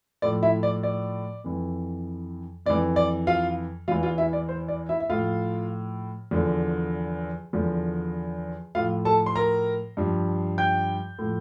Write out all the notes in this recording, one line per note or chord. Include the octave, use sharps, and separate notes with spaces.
A2 F3 D5
E4 E5
D5
D5
F2 E3
F2 E3 D5
D5
F4 F5
E2 E3 F4 F5
F4 F5
E4 E5
D5
C5
D5
E4 E5
E5
A2 F3 F4 F5
E2 D3 F3
E2 D3 F3
A2 F3 F4 F5
A4 A5
C6
A#4 A#5
G2 F3
G5 G6
A2 F3